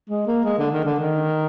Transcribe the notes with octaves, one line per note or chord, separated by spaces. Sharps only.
G#3
A#3
G#3
D3
D#3
D3
D#3